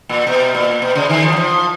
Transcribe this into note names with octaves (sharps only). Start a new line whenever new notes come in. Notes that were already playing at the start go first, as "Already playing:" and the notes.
A#2
B2
A#2
B2
C#3
D#3
F3
F#3
F3